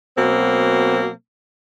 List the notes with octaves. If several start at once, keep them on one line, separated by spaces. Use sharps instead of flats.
B2 F#3 A#3 C4